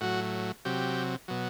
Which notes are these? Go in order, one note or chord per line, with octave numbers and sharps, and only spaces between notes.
A2 F#3 F#4
C3 F#3 G4
B2 F#3